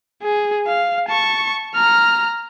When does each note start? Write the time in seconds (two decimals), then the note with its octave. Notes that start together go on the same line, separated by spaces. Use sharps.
0.23 G#4
0.67 F5
1.09 A5 C#6
1.75 A#5 F6